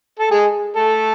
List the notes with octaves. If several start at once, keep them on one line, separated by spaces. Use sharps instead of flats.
A4
G#3 G#4
A3 A4